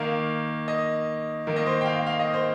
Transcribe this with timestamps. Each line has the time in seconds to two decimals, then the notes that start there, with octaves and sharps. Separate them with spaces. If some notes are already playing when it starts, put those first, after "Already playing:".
Already playing: D#3 A#3 F5
0.68 D#5
1.47 D#3 A#3
1.56 D#5
1.66 C5
1.81 G5
1.86 F5
2.07 F5
2.19 D#5
2.34 C5